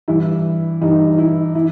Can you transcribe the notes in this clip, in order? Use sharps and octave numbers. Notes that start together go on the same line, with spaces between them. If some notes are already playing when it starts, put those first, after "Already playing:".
G2 E3 E4
G2 E3 D#4
E4
E3 E4